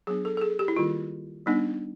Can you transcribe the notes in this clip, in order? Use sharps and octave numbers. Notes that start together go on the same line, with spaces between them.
F#3 B3 D4 G#4
A4
A4
G#4
G4
E4
D#3 G3 A#3 F4
G3 B3 D4 D#4